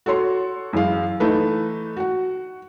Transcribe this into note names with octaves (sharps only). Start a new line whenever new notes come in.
F#4 A4 C#5 C6
F#2 E3 G#3 F5
E3 A3 D#4 B4
F#4 F#5